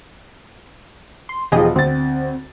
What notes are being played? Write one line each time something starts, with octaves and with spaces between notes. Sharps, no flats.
C6
E1 F3 G4 G#4 D#5
D2 C4 A6